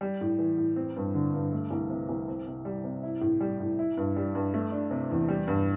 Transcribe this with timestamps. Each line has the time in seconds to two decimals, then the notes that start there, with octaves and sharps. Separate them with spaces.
0.01 G3
0.21 A2
0.39 E3
0.57 A2
0.76 C4
0.96 G2
1.14 D3
1.34 G2
1.52 A3
1.70 C2
1.90 C3
2.09 C2
2.28 C4
2.47 C3
2.65 G3
2.84 C3
3.03 E4
3.21 A2
3.40 G3
3.60 A2
3.79 E4
3.97 G2
4.16 G3
4.35 G2
4.54 A3
4.72 D4
4.91 C3
5.11 E2
5.28 G3
5.47 G2